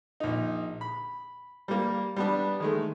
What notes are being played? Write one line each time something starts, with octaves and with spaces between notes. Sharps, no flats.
A#1 D#4
B5
G3 A#3
G3 B3 D4
D#3 G#3 A3